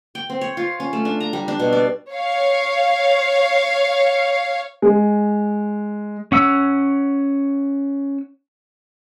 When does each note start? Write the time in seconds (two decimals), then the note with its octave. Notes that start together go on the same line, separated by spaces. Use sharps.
0.15 G5
0.30 C4
0.41 C#5
0.57 F4
0.80 C#4
0.93 A3
1.05 D4
1.20 A#5
1.33 G3
1.48 D4
1.60 B2
1.73 D5
2.13 C#5 F5
4.82 G#3
6.32 C#4 F#5 E6